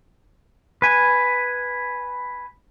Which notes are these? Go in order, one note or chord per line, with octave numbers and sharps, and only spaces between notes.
B4 G#5